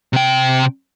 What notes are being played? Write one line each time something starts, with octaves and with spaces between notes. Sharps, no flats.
C3 G5